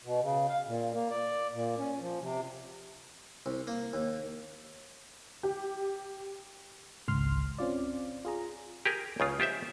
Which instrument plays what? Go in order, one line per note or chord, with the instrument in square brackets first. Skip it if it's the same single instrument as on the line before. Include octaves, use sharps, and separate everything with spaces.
[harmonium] B2
C#3
F5
A#2
A#3
D5
A#2
C#4
F3
C3
[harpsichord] C2
A#3
D#2
[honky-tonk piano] G4
[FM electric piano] G#1 C#2 C6 F6
C4 C#4 F4 D5
F4 G#4 A#5
[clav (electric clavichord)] G4 G#4 A#4
C#2 C#3 F4
F4 G4 C5 E5